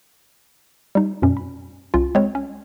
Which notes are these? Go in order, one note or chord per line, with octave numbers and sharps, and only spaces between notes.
G3 D#4
F#2 B2 C#4
B5
C2 C#4 F4
G#3 C4 C#5
C#4